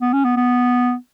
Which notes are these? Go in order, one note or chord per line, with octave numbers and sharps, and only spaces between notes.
B3
C#4
B3
B3